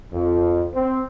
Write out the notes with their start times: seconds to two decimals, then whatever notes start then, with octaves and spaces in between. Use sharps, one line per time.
0.13 F2
0.75 C4